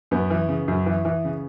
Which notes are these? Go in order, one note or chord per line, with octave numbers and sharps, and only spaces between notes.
F#2 B3
E3
C#3
F#2
E3
E3
C#3